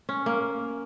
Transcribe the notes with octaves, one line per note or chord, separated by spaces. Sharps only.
C#4
A#3